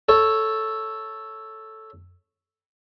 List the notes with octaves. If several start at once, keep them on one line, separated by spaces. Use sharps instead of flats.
A4 C#5